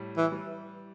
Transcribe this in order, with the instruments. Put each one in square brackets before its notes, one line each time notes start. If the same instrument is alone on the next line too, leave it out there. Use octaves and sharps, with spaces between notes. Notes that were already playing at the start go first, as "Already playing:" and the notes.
Already playing: [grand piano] A2 G3
[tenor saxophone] E3
[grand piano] G3